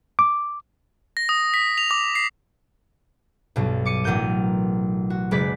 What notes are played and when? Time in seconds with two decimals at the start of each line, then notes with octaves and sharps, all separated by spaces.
0.19 D6
1.17 A#6
1.29 D#6
1.54 B6
1.78 F7
1.91 D6
2.15 C7
3.56 B1 G2 B2
3.85 D6 C#7 D#7
4.04 A1 B2 F#3 A#4 G6 D#7
5.10 F#4
5.31 F#1 G#3 B4 D5 B6